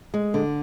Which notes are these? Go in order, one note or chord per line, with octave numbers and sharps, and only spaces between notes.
G#3
D3